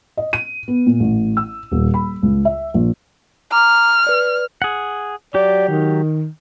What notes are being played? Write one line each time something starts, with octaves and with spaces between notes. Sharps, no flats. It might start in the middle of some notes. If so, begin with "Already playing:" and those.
D#5
D#7
B3
A#2
A1
E6
D#1
B5
C#2
E5
A#1
A#5 D6 F6
B4 D5
G#4 F#5
F#3 G4 D5
D#3